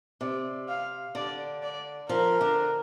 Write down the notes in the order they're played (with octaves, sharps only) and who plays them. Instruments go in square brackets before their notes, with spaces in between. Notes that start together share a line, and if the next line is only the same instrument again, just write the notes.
[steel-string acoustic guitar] C3 [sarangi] D5
[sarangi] F5
[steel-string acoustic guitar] D3 [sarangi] D5
[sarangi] D5
[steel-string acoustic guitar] F3 [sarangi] A#4
[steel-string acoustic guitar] D3